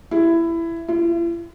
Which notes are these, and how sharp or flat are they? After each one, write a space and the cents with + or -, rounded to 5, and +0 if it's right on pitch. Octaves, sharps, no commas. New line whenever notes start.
E4 +15
E4 +45